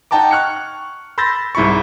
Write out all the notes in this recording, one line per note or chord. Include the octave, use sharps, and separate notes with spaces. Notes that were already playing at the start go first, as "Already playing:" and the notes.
D#4 F#5 G5 A5 A#5 D6
C#6 F6 F#6 G#6 C#7
B5 C6 E6 G6 A6 A#6
C2 G#2 E4 B5 C#6